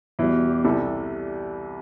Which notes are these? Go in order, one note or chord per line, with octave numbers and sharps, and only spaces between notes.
E2 B2 G3 E4
G4
C2 C3 E3 G3 A4